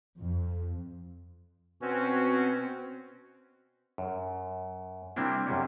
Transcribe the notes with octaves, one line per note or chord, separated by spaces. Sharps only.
F2
B2 C4 C#4 F#4
F#2
C3 G3 A#3 C4 D4 E4
F#2 C3 G3 C#4